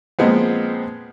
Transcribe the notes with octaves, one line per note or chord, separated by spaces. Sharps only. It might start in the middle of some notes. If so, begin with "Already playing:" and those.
A#2 F3 G#3 B3 C4